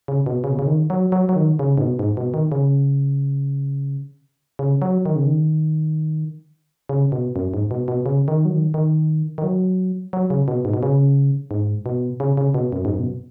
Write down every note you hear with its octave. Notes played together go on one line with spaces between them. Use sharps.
C#3
B2
C#3
B2
C#3
D#3
F#3
F#3
F#3
D#3
C#3
G#2
B2
G#2
B2
D#3
C#3
C#3
F#3
D#3
C#3
D#3
C#3
B2
F#2
G#2
B2
B2
C#3
D#3
F#3
D#3
D#3
D#3
F#3
F#3
C#3
B2
G#2
B2
C#3
G#2
B2
C#3
C#3
B2
F#2
G#2
F#2
B2